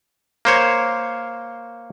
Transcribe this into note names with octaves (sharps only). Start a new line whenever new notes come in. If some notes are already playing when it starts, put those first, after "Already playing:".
A#3 C5 C#5